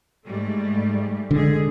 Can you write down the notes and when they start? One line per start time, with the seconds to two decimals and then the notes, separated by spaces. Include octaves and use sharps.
0.25 G#2 G3 A3
1.31 D3 G#3 G#4